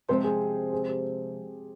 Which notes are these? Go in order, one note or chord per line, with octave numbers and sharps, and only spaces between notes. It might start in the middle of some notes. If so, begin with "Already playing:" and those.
C3 F3 G#3 C4 F4 C5
G#4
G#4
G4